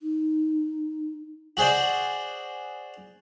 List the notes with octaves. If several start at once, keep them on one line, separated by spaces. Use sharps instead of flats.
D#4
F#4 G#4 C5 D5